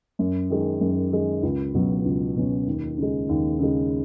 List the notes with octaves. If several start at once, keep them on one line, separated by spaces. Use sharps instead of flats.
F#2
D#3 G#3
F#2
D#3 G#3
C#2
B2 F#3 C#4
C#2
B2 F#3 C#4
D#2
C#3 G#3
D#2
C#3 G#3